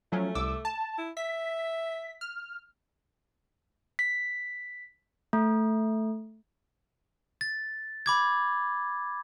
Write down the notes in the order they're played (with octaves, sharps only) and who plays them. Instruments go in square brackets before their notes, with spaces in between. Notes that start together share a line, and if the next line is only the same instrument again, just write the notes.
[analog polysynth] F3 F#3 C#4 [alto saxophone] A3
[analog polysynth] C2 D6 E6
A5
[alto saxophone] E4
[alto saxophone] E5 [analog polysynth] B6
[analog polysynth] F6
[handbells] B6
A3
[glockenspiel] A6
B5 D6 G#6